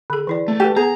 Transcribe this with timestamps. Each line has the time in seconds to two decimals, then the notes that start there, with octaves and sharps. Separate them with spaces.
0.10 D3 G#4
0.27 E3 E4 D5
0.48 A3
0.60 F#4 G4 A4 B4
0.77 B3 G#4 A#5